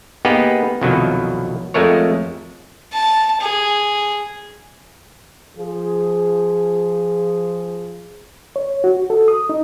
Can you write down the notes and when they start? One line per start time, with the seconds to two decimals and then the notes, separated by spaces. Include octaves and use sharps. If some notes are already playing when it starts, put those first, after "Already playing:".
0.25 A#3 B3 D#4 G4 G#4 B4
0.81 C2 F2 B2 D#3 F#3
1.74 F2 G#3 A3 A#4 C#5
2.93 A5
3.41 G#4
5.57 F3 G#4
8.56 C#5
8.84 F#4
9.10 A4
9.28 D#6
9.49 D#4